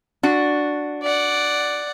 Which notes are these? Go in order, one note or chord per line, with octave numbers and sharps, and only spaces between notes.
D4 F#4
D5 F#5